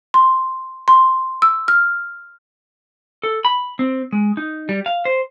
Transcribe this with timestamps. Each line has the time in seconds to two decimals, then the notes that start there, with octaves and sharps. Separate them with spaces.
0.14 C6
0.88 C6
1.42 E6
1.68 F6
3.23 A4
3.45 B5
3.79 C4
4.13 G#3
4.37 D#4
4.69 G3
4.86 F5
5.05 C5